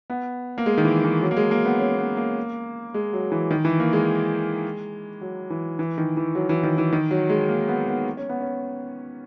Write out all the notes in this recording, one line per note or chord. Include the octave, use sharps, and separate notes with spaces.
B3
A#3
G#3
D#3
E3
E3
F#3
A#3
G#3
A#3
B3
C#4
B3
A#3
G#3
F#3
E3
D#3
E3
A#3
G#3
F#3
E3
E3
D#3
E3
F#3
E3
D#3
E3
D#3
F#3
G#3
A#3
B3
B3
C#4
B3
C#4